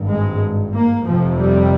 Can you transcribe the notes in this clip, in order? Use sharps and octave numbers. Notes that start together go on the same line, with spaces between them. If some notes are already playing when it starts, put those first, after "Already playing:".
Already playing: G#1 G2
G#3
A#3
F1 F2 C3 F3
G3